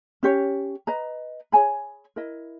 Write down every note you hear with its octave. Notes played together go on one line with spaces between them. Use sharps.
C#4 G4 C#5
B4 D#5 A#5
G#4 C#5 G#5 B5
E4 A#4 D#5